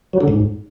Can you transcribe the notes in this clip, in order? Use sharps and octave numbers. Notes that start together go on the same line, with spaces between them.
F#3
D3
G#2